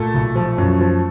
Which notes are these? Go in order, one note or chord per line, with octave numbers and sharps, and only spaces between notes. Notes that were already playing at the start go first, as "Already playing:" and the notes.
Already playing: A#2 A3 A4
B1
F3
F#2
F3